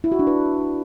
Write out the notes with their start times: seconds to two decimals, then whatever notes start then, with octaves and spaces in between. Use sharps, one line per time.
0.04 E4
0.12 F#4
0.19 D4
0.27 B4